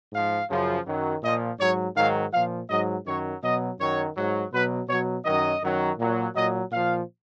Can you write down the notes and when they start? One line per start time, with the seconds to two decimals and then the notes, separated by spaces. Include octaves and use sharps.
0.12 G#2 F3 F5
0.49 F#2 C#3 F3
0.85 F#2 D#3 F#3
1.22 A#2 F3 D#5
1.59 G#2 F#3 C#5
1.96 G#2 D#3 F#3 F5
2.32 A#2 F3 F5
2.69 G#2 F#3 D#5
3.05 F#2 D#3 F#3 C#5
3.42 B2 F#3 D#5
3.78 F#2 D#3 F#3 C#5
4.16 G#2 F#3
4.52 B2 F#3 B4
4.88 B2 F#3 C#5
5.25 F#2 D#3 F#3 D#5
5.62 F#2 D#3 F#3
5.98 A#2 F#3
6.34 A#2 F#3 D#5
6.72 A#2 F3 F5